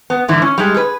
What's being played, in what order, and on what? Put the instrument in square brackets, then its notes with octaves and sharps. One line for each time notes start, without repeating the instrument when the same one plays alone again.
[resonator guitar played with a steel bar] B3
G#2 D3 E3 E4
C#4
G3 G#3
G#4 B4